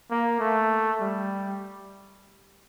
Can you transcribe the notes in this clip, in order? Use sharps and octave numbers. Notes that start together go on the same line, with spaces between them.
A#3
A3
G3